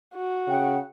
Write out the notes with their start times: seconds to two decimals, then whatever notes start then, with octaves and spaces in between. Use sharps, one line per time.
0.15 F#4
0.48 C#3 F#5 G5